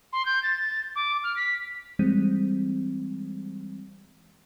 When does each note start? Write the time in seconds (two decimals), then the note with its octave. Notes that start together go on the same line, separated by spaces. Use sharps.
0.13 C6
0.26 G6
0.43 A6
0.96 D6
1.24 F6
1.36 B6
1.99 E3 G3 G#3 C4